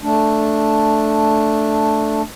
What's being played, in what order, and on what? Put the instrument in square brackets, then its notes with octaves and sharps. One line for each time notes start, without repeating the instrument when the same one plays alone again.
[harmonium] A3 D4